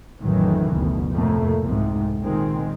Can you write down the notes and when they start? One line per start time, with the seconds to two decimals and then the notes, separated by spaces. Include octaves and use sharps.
0.20 A1 F2 A2 D#3 E3 F#3
0.71 F#1 D2 B2
1.11 F2 A2 C3 A3 A#3
1.62 C2 F2 G#2 C3
2.21 A#2 D#3 G#3 C4